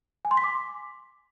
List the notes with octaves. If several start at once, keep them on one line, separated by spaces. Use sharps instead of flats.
G#5
C6
B6
D6